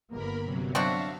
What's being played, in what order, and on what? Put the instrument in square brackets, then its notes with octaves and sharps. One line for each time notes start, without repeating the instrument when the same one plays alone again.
[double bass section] G1 A#3 B3 [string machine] A#4 B5
[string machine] C3 F#3
[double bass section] F#3 [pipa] C4 D4 F#4 [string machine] E5 F5